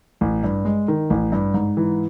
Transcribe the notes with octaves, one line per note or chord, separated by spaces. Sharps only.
A1
G2
G#3
D#3
A1
G2
G#2
E3